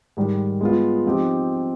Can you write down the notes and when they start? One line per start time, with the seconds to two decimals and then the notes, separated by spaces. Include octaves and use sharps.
0.17 G#2 D#3 G3
0.61 G#3 B3 F4
1.06 F3 C4 D#4 G4